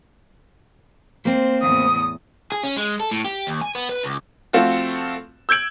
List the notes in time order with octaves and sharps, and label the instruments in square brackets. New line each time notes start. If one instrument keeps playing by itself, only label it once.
[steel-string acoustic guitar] A#3 C4 [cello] C5
[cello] E2 A2 [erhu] D#6
[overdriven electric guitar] G#4
C#4
G#3
A4
A2
G4
D#2
G#5
B3
B4
C#2
[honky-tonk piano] F3 A3 C4 F4 F#4
E6 G6 G#6 D7 F#7